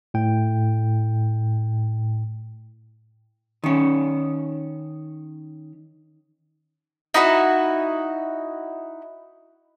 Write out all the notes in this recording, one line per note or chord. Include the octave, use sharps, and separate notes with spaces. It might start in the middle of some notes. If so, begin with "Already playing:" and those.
A2 G5
D#3 C#4
D#4 E4 F#4 D#5